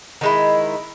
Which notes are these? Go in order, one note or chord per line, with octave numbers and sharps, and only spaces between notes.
D#3 G#3 E4